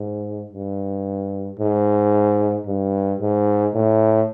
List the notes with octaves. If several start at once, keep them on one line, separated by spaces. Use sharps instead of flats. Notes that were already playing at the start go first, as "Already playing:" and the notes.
Already playing: G#2
G2
G#2
G2
G#2
A2